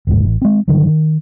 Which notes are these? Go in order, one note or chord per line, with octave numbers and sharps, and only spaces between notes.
F#1 D2 G#2
A1
G#3 C4
G2 D3 D#3 F#3
D#3